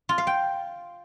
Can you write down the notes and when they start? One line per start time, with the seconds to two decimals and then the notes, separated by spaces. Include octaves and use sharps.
0.09 F4
0.18 F5
0.27 G5